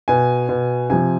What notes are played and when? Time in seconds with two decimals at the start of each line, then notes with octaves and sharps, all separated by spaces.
0.08 B2 G#5
0.49 B2
0.90 C3 F3 G#5